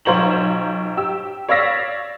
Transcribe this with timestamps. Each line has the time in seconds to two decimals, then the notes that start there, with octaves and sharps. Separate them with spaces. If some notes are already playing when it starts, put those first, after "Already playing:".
0.05 B1 F4 C5 C#5 A#5 F#7
0.97 G4 E6
1.49 C#5 D5 F5 E6 A#6 B6